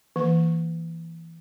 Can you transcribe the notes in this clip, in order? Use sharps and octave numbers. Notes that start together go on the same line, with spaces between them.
E3 A#3